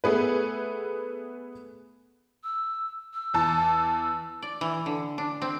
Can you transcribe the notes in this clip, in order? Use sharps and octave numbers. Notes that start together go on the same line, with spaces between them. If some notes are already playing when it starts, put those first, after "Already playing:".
A3 B3 G#4 B4
E6
E6
E2 A5
D5
E3
D3
D4
C4